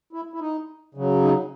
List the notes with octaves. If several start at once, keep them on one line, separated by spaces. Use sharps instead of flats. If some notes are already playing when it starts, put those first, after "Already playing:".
E4
E4
D#4
C#3 F#3
D#4